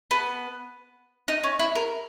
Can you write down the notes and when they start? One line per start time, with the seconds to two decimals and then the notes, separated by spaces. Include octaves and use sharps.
0.11 B3
1.28 D#4
1.43 C#4
1.59 E4
1.75 A#4